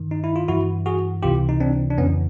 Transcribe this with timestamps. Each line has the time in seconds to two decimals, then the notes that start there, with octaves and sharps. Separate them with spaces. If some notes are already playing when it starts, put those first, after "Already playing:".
Already playing: G2 D#3
0.11 D#4
0.24 E4
0.36 F4
0.48 G2 E3 E4 F#4
0.86 F#4 G#4
1.23 C#2 C3 E3 F4 G4
1.49 D#4
1.60 C4 D4
1.90 D4
1.98 F2 C#3 E3 B3 C#4